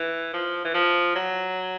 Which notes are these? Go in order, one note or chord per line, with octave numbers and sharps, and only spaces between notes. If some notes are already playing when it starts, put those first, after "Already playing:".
Already playing: E3
F3
E3
F3
F#3